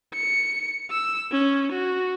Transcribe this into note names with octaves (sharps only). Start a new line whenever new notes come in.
C#7
E6
C#4
F#4